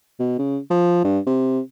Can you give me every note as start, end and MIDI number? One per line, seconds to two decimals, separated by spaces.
0.19 0.38 47
0.38 0.58 49
0.70 1.00 53
1.04 1.19 43
1.27 1.59 48